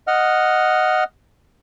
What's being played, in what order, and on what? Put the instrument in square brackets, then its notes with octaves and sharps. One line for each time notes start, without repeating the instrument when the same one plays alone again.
[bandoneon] D#5 F#5 F6